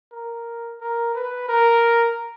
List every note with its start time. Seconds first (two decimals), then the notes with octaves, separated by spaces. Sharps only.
0.12 A#4
0.80 A#4
1.15 B4
1.48 A#4